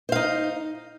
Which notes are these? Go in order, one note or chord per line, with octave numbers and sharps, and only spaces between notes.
D#4 C5 F5